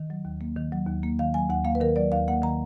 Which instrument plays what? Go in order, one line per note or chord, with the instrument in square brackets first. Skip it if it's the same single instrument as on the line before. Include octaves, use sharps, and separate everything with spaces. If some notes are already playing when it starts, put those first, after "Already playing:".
Already playing: [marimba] D#3
F#3
D#2
A#3
D#3
F#3
D#2
A#3
D#3 F5
F#3 G#5
D#2 F#5
A#3 F5
B4
D#3 A#4
F#3 D5
D#2 F5
A#3 F#5
D#3 A#5